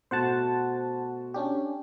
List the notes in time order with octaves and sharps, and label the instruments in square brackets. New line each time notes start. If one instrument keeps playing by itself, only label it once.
[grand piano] B2 A3 F#4 [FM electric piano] C5 F#5 A5
[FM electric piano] C#4 D4 G4